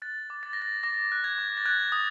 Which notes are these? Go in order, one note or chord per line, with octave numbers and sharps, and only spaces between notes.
F#6 A6
D6
A6
F#6 A#6
A6
D6 A#6
F#6
G#6
D6
A6
F#6 G#6
D#6